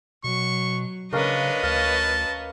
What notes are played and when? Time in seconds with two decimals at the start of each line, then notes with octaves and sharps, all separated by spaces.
0.24 B2 F#3 C#6
1.13 C#3 A#3 C#4 D4 A#4 B4 C#5 D#5
1.63 D2 F5 A5